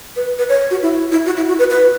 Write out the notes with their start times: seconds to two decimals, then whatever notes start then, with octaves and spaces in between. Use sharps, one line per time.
0.16 B4
0.39 B4
0.49 C#5
0.71 F#4
0.82 E4
1.12 E4
1.26 F#4
1.37 E4
1.48 F#4
1.59 B4
1.70 B4